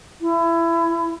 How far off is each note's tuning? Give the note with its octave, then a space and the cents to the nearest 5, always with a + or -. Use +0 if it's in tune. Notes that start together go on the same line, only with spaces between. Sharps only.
E4 +25